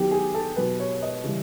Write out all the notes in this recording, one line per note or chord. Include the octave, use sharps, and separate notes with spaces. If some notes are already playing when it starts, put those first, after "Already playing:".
Already playing: D#3 F#3 B3 G4
G#4
A4
B2 F#3 B3 B4
C#5
D#5
C#3 E3 G3